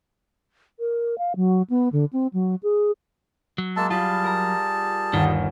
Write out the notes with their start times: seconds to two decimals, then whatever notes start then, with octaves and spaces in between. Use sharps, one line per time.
0.79 A#4
1.18 F5
1.36 F#3
1.70 B3
1.92 D3
2.13 C4
2.33 F#3
2.63 G#4
3.58 F#3
3.77 G#3 A#3 A5 E6
3.90 G3 F4 G#4 A5 B5
4.24 A#4 A#5
5.13 G1 D#2 D#3